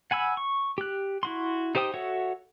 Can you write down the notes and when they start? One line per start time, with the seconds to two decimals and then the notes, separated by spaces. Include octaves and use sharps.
0.11 F#5 G#5 B5 E6
0.37 C#6
0.78 G4 F#6
1.23 E4 F#4 C6
1.75 D#4 G4 C5 G5 D#6
1.94 F#4 A4 C#5 E5 F#5